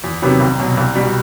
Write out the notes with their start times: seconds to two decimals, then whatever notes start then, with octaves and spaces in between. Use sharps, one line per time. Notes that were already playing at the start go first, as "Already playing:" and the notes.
0.04 E2
0.22 C3 D#3 F#3 B3
0.40 C2
0.59 B2 F#3
0.77 C2
0.95 B2 G3